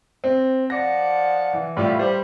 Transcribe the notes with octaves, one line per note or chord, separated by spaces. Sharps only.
C4
F3 D5 F#5 A#6
E3
A2 G3 A3 F4
G3 C5